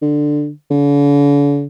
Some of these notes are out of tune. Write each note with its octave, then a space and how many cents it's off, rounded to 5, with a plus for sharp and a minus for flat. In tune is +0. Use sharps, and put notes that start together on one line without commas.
D3 +10
D3 -45